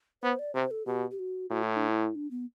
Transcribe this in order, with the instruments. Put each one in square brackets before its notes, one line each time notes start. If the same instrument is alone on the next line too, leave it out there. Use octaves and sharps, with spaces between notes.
[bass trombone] B3 [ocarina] C5
[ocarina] D5
[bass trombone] C3 [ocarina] C5
[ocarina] A4
[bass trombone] B2 [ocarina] G4
[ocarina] G4
F#4
[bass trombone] A2 [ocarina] F#4
[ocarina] E4
D4
E4
D4
B3